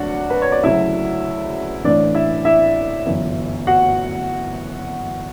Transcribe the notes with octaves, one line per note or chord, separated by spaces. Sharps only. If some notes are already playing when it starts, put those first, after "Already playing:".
Already playing: D2 F#3 D4 F#4 D5 F#5
B4
C#5
D5
D2 C#3 F#3 E4 E5
A1 A2 E3 D4 D5
E4 E5
E4 E5
G1 F#2 E3
F#4 F#5